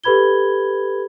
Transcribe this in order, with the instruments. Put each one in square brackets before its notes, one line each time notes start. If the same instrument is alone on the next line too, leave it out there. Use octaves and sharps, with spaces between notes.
[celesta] G4 A4 B4 B5 G#6 G7